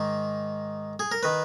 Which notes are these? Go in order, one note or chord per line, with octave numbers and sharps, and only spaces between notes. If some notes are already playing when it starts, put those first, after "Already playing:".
Already playing: G#2 D#3
G#4
A#4
D#3 B4